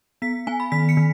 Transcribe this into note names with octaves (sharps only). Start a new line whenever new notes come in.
B3 B6
B3 G#5
B5
D#3 B6
C#7
D#3